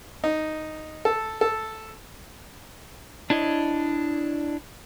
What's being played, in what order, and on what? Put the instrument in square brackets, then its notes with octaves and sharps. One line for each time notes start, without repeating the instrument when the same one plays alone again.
[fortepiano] D#4
A4
A4
[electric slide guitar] D4 E4 C#5 D#5